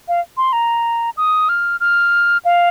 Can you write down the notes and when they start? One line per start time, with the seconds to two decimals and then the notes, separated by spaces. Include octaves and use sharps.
0.08 F5
0.37 C6
0.53 A#5
1.17 D#6
1.49 F6
1.80 F6
2.45 F5